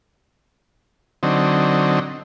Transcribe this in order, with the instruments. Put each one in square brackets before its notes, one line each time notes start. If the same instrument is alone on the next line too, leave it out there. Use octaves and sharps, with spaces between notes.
[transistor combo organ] D3 F#3 C4 D#4